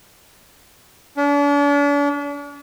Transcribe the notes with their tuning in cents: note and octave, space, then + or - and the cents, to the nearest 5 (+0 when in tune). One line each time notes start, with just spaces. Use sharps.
D4 -40